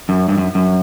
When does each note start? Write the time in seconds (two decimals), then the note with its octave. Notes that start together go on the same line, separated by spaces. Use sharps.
0.09 F#2
0.28 G2
0.37 F#2
0.55 F#2